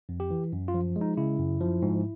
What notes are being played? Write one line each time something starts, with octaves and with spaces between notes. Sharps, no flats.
F2
G4
E3
F#2
F4
F3
G#3
D#4
C#3 E4
F#2
F3
G#2